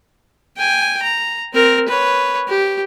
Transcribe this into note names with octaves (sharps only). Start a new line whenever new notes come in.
G5 G#5
A#5
C4 A#4
B4 C#5
G4